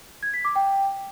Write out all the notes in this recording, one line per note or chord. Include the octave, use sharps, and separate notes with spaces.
G#6
B6
D6
G5
G5